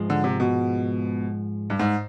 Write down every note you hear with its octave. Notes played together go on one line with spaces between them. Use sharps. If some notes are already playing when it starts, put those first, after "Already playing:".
Already playing: G#2 F3 G#3
D3
C3
B2
G2
G#2